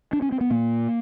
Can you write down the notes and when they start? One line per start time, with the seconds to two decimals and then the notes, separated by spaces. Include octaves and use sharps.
0.13 D4
0.22 C#4
0.32 C4
0.41 B3
0.50 A#2 A#3